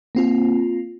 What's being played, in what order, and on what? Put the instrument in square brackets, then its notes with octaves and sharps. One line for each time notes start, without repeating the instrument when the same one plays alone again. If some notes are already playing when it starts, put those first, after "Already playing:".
[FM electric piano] A#3 C4 F4